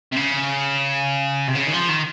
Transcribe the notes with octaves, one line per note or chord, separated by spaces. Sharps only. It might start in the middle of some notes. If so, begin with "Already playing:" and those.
C3
C#3
C3
C#3
D#3
F3
D#3